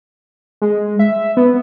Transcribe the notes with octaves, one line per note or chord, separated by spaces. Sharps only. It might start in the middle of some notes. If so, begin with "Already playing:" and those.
G#3
E5
B3